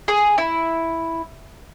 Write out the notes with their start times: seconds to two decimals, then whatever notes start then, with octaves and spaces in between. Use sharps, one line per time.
0.08 G#4
0.38 E4